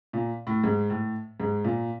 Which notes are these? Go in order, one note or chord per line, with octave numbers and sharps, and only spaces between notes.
A#2
A2
G#2
A2
G#2
A#2